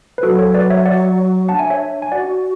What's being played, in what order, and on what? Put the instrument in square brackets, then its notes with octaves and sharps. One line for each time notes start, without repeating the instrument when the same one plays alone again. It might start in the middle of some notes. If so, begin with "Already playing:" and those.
[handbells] B4
[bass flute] F#3 [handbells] F#4 A4
[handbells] A4 C#5
B4 D5
C#5 E5
D5 F#5
[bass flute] D4 [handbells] F#5 A5
[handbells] E5 G#5
C#5 E5
G#5
[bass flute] F#4 [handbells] D5 F#5